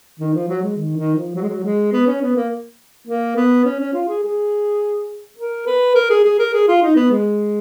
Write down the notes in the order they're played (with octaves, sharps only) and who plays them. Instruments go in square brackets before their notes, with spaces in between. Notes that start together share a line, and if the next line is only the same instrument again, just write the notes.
[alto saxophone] D#3
F3
F#3
G#3
D#3
D#3
F3
F#3
G#3
F#3
G#3
B3
C#4
B3
A#3
A#3
B3
C#4
C#4
F4
G#4
G#4
A#4
B4
A#4
G#4
G#4
A#4
G#4
F4
D#4
B3
G#3